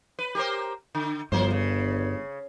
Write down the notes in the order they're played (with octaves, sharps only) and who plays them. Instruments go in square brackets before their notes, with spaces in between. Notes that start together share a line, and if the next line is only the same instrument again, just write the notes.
[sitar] B4
G4 A#4 C5
D3
[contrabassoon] G1 [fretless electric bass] G2 [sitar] F3 C5
[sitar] C#3